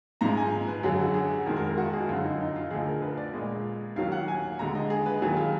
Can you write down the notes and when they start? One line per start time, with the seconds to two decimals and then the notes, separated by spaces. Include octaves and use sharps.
0.21 G#2 F3 G#3 A#5
0.37 G#5
0.67 B4
0.83 F#2 D3 F#3 G#4
0.99 F#4
1.14 G#4
1.46 F2 D#3 G#3 A#4
1.57 A#4
1.67 A#4
1.77 F#4
1.93 G#4
2.01 F#4
2.09 F#2 D3 F3 F4
2.24 D#4
2.40 D#4
2.56 F4
2.71 D2 D3 F3 G#4
2.87 A#4
3.02 B4
3.17 D5
3.33 A#2 G#3 D#5
3.96 D#2 D#3 F#3 F5
4.12 F#5
4.28 G#5
4.59 D#2 D3 G#3 A#5
4.75 D#5
4.90 G#4
5.06 B4
5.22 D#2 D#3 F#3 G#4
5.37 F4